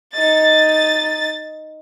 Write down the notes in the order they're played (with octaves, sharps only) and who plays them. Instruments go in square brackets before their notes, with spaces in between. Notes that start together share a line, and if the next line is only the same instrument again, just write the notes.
[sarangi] D#4 [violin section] A6